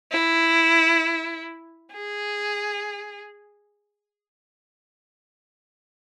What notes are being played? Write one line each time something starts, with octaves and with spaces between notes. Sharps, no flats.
E4
G#4